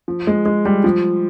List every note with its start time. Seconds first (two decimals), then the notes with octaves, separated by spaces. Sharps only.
0.08 F3
0.27 G#3
0.46 G#3
0.65 G3
0.84 F3